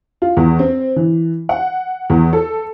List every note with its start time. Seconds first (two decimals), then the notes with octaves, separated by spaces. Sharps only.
0.22 F4
0.37 E2
0.59 C4
0.96 E3
1.49 F#5
2.10 E2
2.33 A4